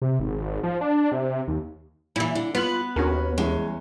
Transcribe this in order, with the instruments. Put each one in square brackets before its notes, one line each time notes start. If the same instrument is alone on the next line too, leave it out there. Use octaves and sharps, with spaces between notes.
[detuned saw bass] C3
G#1
F3
D4
C3
D#2
[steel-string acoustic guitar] A#2 E3 [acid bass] E4
[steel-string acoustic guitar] D3
[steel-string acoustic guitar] B3 B4 F#5 [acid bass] F4
[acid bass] D#2 [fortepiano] C#4 F#4 A#4
[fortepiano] E2 C#4 [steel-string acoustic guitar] G#3